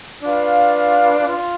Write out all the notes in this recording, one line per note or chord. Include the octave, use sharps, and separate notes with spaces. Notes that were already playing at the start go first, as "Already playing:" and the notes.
D4 F4 B4 F5
F4